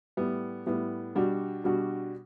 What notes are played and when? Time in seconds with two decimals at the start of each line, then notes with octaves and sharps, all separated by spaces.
0.17 A2 G3 B3
0.66 A2 G3 B3
1.15 B2 G3 D4 F#4
1.64 B2 G3 D4 F#4